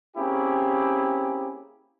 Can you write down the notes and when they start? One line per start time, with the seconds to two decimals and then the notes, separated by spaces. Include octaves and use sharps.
0.16 A#3 C4 C#4 E4 G4 G#4